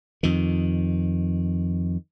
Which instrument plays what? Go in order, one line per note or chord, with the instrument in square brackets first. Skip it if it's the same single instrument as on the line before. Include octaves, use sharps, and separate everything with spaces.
[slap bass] F2 D#3